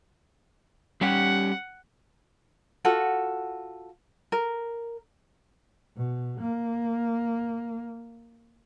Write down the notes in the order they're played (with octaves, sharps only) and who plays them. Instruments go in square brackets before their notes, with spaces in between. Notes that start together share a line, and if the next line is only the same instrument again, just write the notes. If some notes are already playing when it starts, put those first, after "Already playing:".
[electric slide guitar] G3 C#4 G4 [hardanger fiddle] F#5
[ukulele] F4 F#4 A4 F#5
A#4
[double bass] B2
A#3